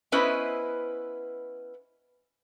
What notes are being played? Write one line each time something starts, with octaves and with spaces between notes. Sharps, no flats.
B3 C#4 E4 B4 C5 D#5